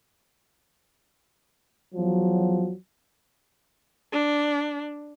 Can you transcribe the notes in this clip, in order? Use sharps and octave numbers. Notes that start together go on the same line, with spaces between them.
E2 F3 F#3
D4